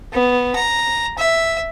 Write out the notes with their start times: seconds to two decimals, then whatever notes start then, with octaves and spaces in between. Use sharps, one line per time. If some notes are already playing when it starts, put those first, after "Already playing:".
0.13 B3
0.55 A#5
1.18 E5